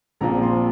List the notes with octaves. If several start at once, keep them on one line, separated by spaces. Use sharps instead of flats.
A#1 A#2 F3 C4 A#5
C6